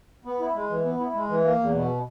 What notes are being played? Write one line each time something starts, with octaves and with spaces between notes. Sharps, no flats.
B3
E4
G#3
E3
B3
E4
G#3
E3
A#3
E2
B2